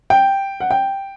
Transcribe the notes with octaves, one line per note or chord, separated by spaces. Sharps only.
G5
F#5
G5